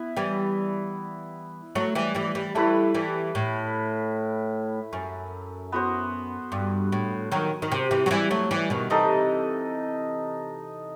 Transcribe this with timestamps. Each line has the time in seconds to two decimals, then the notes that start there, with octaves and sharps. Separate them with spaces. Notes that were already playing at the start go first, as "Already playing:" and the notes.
Already playing: B3 E4
0.17 E3 G3
1.75 F#3 A3
1.95 E3 G3
2.15 E3 G3
2.35 E3 G3
2.55 E3 G3 A3 E4 B4
2.94 E3 G3
3.35 A2
4.93 F#2
5.72 B3 F#4 C5
6.52 G2
6.92 A2
7.31 D#3 F#3
7.62 D#3
7.72 C3
7.91 C3 E3
8.06 F#3
8.11 E3 G3
8.31 F#3 A3
8.51 E3 G3
8.70 B2 D#3
8.90 C3 E3 D#4 A4 D#5